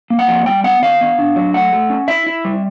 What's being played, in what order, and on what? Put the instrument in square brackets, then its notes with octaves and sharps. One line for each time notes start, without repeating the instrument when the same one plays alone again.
[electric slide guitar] A#3
F#5
F2
G3 G5
B3 F#5
D#3 F5
B3
D4
F#3
A3 F#5
A3
C#4
E4 E5
E4
G3